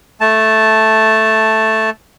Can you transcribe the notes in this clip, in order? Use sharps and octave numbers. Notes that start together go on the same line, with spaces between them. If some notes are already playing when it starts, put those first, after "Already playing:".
A3 A5